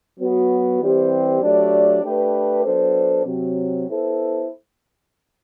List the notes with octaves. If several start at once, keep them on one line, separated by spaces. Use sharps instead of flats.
F#3 B3 F#4
E3 G3 C4 G4 C5
F#3 A3 D4 G4 D5
A3 D4 G4 B4
F#3 B3 D4 A4 C5
C3 F#3 C4
B3 E4 A4 C5